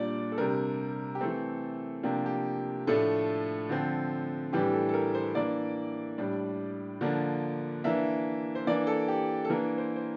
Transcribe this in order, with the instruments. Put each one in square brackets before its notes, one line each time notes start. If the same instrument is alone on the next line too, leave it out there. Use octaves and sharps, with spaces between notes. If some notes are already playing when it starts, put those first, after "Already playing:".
Already playing: [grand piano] A#2 G3 D4 D5
A4
C3 G3 D4 A#4
G4
E3 A3 C4 A4
C3 F3 A#3 D4 G4
G4
A2 F3 A3 D4 A4
D3 F3 C4
A2 E3 G3 D4 G4
A4
A4
A#4
C5
E3 A#3 D4 D5
A2 G3 D4
D3 F3 A#3 D4
E3 A#3 D4 E5
C5
E3 A#3 D4 D5
A4
G4
A4
E3 A#3 D4 A#4
C5
C5